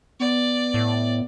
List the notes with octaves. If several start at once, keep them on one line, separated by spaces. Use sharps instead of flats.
B3 D5
A2